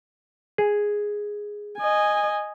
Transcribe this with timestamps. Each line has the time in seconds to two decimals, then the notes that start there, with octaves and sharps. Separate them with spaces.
0.58 G#4
1.78 D#5 G#5